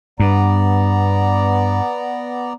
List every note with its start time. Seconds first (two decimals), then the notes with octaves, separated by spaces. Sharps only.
0.20 G2 B3 D5 A#5